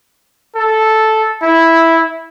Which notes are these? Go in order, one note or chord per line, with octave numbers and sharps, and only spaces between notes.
A4
E4